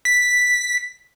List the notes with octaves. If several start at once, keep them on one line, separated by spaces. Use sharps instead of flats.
B6